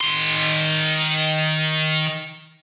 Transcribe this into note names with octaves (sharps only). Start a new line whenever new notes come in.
D#3 C6